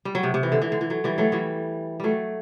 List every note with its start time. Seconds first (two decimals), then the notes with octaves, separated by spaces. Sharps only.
0.05 G3
0.15 F#3
0.23 C3
0.34 C3
0.43 E3
0.52 D3
0.62 E3
0.72 D3
0.81 E3
0.90 F#3
1.04 E3 G3
1.18 F#3 A3
1.32 E3 G3
2.00 F#3 G3 A3